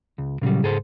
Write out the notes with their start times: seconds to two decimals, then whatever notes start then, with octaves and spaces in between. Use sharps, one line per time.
0.18 C#2
0.42 A#2 C#3 F#3 G3
0.63 C#2 G#2 G#4 A4 C5